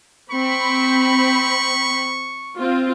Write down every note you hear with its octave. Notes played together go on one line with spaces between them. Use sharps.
C4 B5 C#6
C4 F4